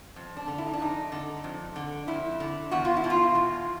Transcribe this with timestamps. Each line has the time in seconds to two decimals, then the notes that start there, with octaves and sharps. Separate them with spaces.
0.16 F2
0.37 D4
0.48 D3
0.58 E4
0.66 D#4
0.73 D4
0.80 F2 D#4
1.12 D3
1.44 F2
1.76 D3
2.08 F2 E4
2.40 D3
2.72 E2 F#4
2.85 F4
2.97 E4
3.04 B2
3.10 F4
3.35 E2